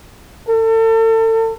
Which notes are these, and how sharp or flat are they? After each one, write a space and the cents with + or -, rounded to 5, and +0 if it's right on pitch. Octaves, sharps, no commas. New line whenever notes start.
A4 +35